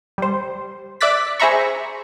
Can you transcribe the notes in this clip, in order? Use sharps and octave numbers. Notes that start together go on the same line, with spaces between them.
G3 C5
D5 E5 D6 F#6 A6 B6
G#4 C5 E5 A#5 B5 C#6